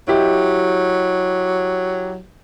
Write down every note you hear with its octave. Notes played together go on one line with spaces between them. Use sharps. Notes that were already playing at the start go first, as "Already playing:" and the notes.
F#3 E4 G4 D#5